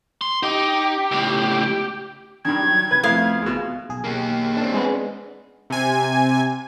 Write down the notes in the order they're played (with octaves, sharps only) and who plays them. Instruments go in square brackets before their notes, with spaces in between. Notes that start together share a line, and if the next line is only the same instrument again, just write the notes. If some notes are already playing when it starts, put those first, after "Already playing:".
[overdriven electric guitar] C6
[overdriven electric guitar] D#4 [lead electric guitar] G4
[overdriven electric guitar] C#2 A2
[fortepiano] G2 D#3 [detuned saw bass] D4 [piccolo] G#6
[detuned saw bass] F#3
[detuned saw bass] C3 [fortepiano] B4
[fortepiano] F2 B3 E4 [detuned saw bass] A3 [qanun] F5
[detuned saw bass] G#1 [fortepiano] B2 G#3
[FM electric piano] B1 G#4
[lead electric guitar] A#3 G4
C4 D4
[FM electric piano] G#3 B3
[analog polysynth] C3 G#5